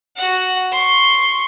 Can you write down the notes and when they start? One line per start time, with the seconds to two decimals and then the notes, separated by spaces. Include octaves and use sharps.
0.17 F#4 F#5
0.72 C6 C#6